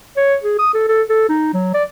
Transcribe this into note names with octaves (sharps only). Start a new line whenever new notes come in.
C#5
G#4
D#6
A4
A4
A4
D#4
F#3
D5